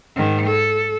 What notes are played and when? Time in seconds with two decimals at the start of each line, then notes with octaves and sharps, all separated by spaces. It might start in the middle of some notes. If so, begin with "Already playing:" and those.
0.16 G#2 D#3
0.46 A4